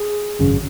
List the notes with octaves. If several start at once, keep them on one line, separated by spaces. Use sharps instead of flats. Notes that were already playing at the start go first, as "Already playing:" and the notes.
Already playing: G#4
G#1 F#2 C#3